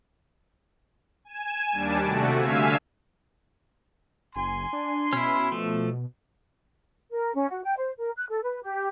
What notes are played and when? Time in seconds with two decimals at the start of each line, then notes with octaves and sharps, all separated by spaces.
1.25 G#5 E7
1.72 D#2 G3 D4 A5 D7
2.02 C3 A3 F#4
2.36 D3 E5 F5 G#5 E6
4.36 F#1 G#5 C6
4.73 D4
5.13 B2 C#4 E4
5.52 F3 A3
7.12 A#4
7.34 C#4
7.49 F#4
7.63 G5
7.77 C5
7.98 A#4
8.17 F#6
8.30 A4
8.43 B4
8.63 G4